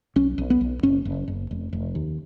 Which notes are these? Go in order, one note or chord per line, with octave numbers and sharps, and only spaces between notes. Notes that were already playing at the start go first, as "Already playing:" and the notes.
B1 C#4
B1
B3
B1
F#1 C#4
F#1
F#1
F1
F1
D#2